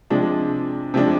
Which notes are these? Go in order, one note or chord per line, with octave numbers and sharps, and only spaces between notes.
C3 F3 G#3 D4
C3 F3 G#3 D4